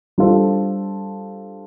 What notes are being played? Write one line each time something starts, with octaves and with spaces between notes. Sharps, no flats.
G3 D4 F4 A4 C5